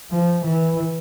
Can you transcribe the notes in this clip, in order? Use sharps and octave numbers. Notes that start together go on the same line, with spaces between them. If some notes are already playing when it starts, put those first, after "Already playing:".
F3
E3